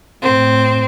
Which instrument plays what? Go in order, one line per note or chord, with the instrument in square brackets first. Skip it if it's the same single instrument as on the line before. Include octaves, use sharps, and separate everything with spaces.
[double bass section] A2 [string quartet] C4